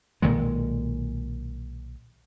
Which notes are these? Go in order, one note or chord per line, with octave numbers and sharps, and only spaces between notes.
B1 A#2 D#3 G#3